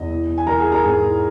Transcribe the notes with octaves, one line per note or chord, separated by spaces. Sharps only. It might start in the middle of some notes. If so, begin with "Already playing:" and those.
Already playing: E2 D#5
E3
E3
G#5
E3 A#4 A#5
G#4 G#5
E3
A#4 A#5
G#2 G#4 G#5
E3